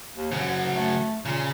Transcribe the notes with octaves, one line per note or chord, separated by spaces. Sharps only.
D#2
G#2 C#3 F#3
A3
A#2 C#3